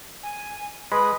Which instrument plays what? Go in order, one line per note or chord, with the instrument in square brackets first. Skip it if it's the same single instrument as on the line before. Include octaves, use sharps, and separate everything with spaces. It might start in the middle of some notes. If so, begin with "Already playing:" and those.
[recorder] G#5
[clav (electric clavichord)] G#3 [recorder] B4 [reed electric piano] B5 [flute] D#6